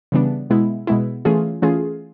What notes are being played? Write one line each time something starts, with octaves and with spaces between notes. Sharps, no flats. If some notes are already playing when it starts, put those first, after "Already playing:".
C#3 E3 G3 B3 D4
B2 G#3 B3 E4
B2 G#3 B3 E4
E3 A3 C#4 F4 G#4
E3 A3 C#4 F4 G#4